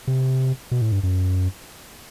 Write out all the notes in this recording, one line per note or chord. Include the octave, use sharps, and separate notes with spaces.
C3
B2
A2
G2
F#2